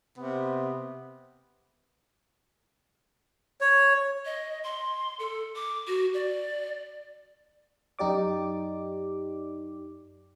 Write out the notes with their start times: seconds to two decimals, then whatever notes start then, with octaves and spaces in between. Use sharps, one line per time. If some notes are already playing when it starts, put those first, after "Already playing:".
0.18 C3 B3
3.61 C#5
4.25 D#5
4.64 C6
5.19 A4
5.56 D6
5.87 F#4
6.14 D5
7.99 F#2 D#4 G4 D5 D6